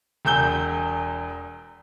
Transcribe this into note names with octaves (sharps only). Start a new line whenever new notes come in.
E1 E2 E6 G6 G7